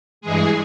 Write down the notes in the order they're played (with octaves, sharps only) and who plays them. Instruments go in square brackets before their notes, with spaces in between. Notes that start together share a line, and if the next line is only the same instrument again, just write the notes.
[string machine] G2 E3 G#3 G#4